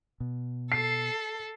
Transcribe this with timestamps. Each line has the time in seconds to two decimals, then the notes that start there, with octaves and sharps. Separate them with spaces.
0.20 B2
0.72 A4 C7